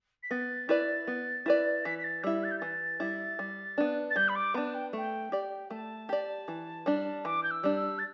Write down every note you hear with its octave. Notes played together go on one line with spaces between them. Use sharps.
B6
B3 A6
E4 B4 D5
B3
E4 B4 D5
E3 B6
B6
A6
G3 E4 E6
A6
G6
E3 A6
G3 E4
G3
B3 D4
A6
G3 G6
B5
D6
B3 D4 A5
G5
A3 G5
G4 D5
A3 A5
G4 D5
E3
G3 D4
E3 D6
G6
E6
G3 D4
E6
A6